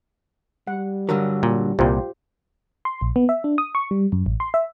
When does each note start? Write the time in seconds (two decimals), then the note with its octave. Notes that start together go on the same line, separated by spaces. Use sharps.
0.67 G3 F#5
1.09 G2 D3 F#3 A#4
1.43 A#2
1.79 C2 A#2 F4 G4 C5
2.85 C6
3.01 A#1
3.16 B3
3.29 E5
3.44 D4
3.58 D#6
3.75 C#6
3.91 G3
4.12 F#2
4.26 A1
4.40 C6
4.54 E5